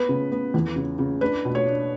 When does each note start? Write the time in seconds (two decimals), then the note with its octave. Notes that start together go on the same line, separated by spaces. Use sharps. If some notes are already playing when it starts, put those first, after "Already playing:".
Already playing: B3 B4
0.09 C#3
0.32 B3
0.54 E2
0.76 C#3
0.99 C#3
1.21 D4 B4
1.45 B2
1.55 C#5
1.67 D4